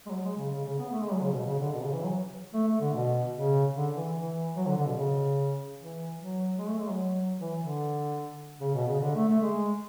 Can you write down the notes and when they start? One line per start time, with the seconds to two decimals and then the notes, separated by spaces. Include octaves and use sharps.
0.06 G#3
0.11 F#3
0.25 G#3
0.38 C#3
0.51 C#3
0.65 C#3
0.79 B3
0.92 A3
1.02 G#3
1.12 F#3
1.22 C#3
1.33 B2
1.46 C#3
1.59 D3
1.73 B2
1.83 C#3
1.93 E3
2.04 F#3
2.54 A3
2.67 A3
2.81 D3
2.95 B2
3.35 C#3
3.76 D3
3.96 E3
4.16 E3
4.57 F#3
4.67 D3
4.77 D3
4.86 B2
4.97 C#3
5.78 E3
6.19 F#3
6.59 G#3
6.69 A3
6.79 G#3
6.89 F#3
7.40 E3
7.60 D3
8.61 C#3
8.75 B2
8.88 C#3
9.01 D3
9.15 A3
9.28 A3
9.42 G#3